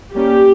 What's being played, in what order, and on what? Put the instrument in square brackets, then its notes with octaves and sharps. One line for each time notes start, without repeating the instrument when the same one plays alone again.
[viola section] G3 A#3 C#4 G4